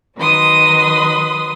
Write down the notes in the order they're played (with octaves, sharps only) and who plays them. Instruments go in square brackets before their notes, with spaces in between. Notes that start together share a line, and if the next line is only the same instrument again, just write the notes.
[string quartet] D#3 F#3 B4 C6 D#6